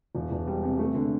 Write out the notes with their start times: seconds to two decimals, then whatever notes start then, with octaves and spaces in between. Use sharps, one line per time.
0.15 E1
0.32 E1
0.47 G3
0.63 C3
0.79 A3
0.95 D3